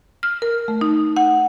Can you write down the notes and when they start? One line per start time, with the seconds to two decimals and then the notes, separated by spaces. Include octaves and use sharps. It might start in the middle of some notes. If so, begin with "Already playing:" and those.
0.23 F6
0.42 A#4
0.68 A3
0.81 D#4
1.17 F#5